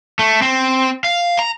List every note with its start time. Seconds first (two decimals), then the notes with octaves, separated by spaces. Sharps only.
0.19 A3
0.42 C4
1.04 F5
1.39 A#5